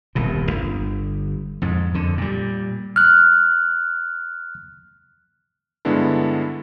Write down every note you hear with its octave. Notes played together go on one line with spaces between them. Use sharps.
D#1 C2 B2
G1
F2 G#2
F2 D3
A#2 G3
F6 F#6
G2 D3 G#3 B3 D4 E4